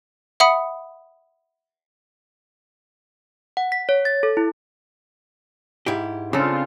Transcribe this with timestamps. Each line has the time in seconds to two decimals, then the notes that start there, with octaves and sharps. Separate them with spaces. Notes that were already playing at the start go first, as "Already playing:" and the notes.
0.40 E5 F#5 B5 D#6 C#7
3.57 F#5
3.72 B6
3.89 C#5
4.05 A6
4.23 A4
4.37 E4
5.86 G#2 E4 G4
6.33 C#3 C4 D4 F4 A4